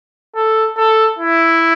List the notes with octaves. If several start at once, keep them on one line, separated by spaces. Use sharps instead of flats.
A4
A4
E4